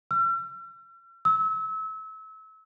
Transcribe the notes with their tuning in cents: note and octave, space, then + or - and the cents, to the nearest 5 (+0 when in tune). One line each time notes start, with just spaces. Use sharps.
E6 +45
E6 -30